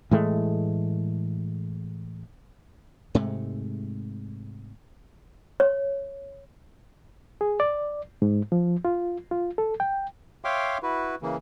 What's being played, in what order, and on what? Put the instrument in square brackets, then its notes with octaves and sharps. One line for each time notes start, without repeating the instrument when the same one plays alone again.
[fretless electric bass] A2 E3 G#3 A3
[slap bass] G#2 C3 G#3 A3
[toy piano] C#5
[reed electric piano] G#4
D5
G#2
F3
F4
F4
A4
G5
[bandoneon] C#5 E5 F5 G5 C6 D6
E4 F#4 B4
C#3 E3 A#3